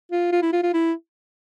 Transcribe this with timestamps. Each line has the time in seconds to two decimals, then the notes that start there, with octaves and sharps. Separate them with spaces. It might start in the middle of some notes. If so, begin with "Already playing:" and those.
0.11 F4
0.32 F4
0.42 E4
0.53 F4
0.63 F4
0.74 E4